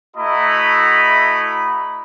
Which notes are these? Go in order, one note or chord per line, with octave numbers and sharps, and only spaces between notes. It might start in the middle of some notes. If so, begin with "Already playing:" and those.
A3 E4 F#4 D#5 A#5 B5